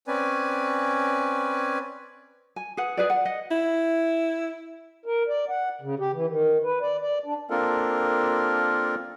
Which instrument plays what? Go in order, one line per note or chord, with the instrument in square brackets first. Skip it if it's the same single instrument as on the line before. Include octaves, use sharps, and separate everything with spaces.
[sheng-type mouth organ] C4 C#4 B4 D5 G#5
[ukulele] G#5
G#4 B4 F#5
G#4 B4 D5
F#5
D#5 F#5
[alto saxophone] E4
[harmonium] A#4
D5
F#5
C#3
G4
E3
D#3
B4
D5
D5
D4
[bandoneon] A#3 C4 D4 F4 A4 A#4